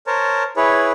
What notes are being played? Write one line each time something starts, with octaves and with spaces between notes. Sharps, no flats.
A#4 C5 C#5 A5
E4 G#4 B4 C#5